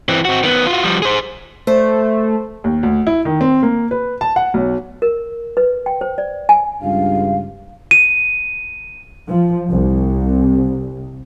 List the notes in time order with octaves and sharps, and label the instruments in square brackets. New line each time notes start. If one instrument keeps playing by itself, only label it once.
[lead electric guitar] E3 C4
C4 F#4
D#3 B3
F4 F#4
F3 G3
G#4 C5
[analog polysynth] A3 [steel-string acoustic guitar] C5
[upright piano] D#2
D2
E4
D#3
C4
A#3
B4
A5
F#5
B1
[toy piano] A#4
B4
G5
C5
D5
G#5
[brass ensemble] C#2 G2 [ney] F5
[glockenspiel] D#7
[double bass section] F3
C2